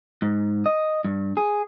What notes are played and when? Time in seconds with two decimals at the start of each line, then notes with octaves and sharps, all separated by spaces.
0.22 G#2
0.66 D#5
1.04 G2
1.37 G#4